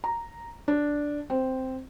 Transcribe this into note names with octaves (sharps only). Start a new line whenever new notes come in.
A#5
D4
C4